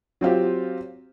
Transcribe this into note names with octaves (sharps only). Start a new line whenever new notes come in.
F#3 C4 F4 G4